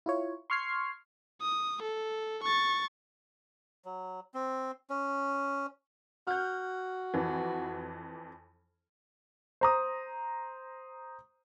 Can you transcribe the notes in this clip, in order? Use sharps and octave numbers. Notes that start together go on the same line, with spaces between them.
E4 F4 C#5
C6 C#6 F6 G#6 C7
D#6
A4
C#6 A6
F#3
C4
C#4
F#4 F6 G6
F2 E3
C5 A#5 D#6